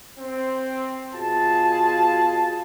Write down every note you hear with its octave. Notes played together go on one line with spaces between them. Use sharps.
C4
B2 F4 G#4 A5